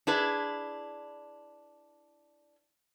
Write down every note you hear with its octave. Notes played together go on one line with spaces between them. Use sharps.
D4 E4 G#4 B4